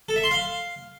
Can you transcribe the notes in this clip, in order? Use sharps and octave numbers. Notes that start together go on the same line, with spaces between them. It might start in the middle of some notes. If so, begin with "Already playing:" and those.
A4
E5
C6
F5